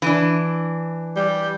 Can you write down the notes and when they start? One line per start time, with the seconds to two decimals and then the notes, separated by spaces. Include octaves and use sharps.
0.02 E3 D4
1.16 G3